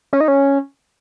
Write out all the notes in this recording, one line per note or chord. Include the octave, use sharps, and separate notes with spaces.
C#4
D#4
C#4